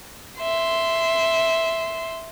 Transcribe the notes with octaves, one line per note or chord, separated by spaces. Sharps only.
E5 C6